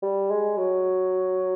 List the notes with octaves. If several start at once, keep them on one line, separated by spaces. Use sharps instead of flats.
G3
G#3
F#3